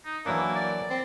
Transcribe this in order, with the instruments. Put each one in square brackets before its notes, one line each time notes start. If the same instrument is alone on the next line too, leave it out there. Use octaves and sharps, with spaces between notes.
[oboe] D#4
[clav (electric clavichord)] E3 F#3 D4 [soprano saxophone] A#3 [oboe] E4
[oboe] D5
[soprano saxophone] C4